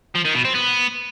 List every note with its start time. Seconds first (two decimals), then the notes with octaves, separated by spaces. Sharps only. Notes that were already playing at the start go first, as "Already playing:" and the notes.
0.15 F3
0.25 D#3
0.35 B2
0.45 C4
0.55 B3